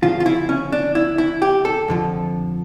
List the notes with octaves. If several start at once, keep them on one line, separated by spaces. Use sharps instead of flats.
D2 C#3 F3 F4
F4
E4
C#4
D4
E4
E4
G4
A4
F2 D3 F3